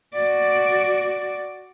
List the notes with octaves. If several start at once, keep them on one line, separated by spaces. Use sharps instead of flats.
F#4 D5